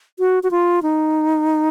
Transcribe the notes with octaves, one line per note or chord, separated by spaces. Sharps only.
F#4
F#4
F4
D#4